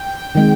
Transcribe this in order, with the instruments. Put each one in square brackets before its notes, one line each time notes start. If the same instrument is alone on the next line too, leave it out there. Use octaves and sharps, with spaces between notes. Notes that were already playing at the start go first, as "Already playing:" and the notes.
Already playing: [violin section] G5
[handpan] D#3 G#3 C4